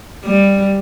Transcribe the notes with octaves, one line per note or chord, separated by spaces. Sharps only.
G3